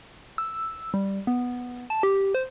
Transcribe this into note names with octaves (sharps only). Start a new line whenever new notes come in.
E6
G3
B3
A5
G4
C5